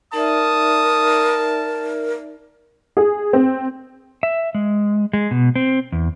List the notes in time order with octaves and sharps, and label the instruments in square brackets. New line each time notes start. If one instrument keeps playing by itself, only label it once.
[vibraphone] D#4 D5 E5 [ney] A#4 [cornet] A5 [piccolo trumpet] D#6
[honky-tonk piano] G#4
C4
[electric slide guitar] E5
G#3
G#3
B2
C4
E2